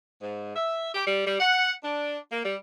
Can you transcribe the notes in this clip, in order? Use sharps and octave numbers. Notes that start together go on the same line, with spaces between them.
G#2
E5
G4
G3
G3
F#5
D4
A#3
G3